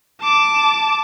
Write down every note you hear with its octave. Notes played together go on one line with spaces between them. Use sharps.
A5 D6